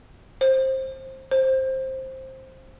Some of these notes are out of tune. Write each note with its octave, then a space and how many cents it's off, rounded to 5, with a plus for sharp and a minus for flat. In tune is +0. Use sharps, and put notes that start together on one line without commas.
C5 +15
C5 +10